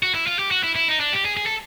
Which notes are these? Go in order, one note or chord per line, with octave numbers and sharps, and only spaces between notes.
F#4
E4
F4
G4
F#4
E4
E4
D#4
D4
G4
G#4
G#4
A4